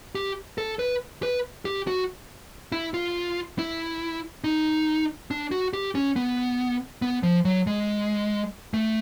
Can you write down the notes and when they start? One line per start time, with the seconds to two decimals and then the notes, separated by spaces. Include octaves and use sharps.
0.15 G4
0.58 A4
0.79 B4
1.23 B4
1.65 G4
1.87 F#4
2.72 E4
2.94 F4
3.59 E4
4.44 D#4
5.31 D4
5.51 F#4
5.73 G4
5.95 C#4
6.16 B3
7.02 B3
7.23 F3
7.45 F#3
7.67 G#3
8.74 A3